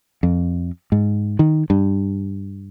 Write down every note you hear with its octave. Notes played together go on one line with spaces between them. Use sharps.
F2
G#2
D#3
G2